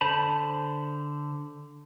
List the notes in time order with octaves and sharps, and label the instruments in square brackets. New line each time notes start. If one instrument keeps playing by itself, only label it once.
[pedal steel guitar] D3 C5 A5 B5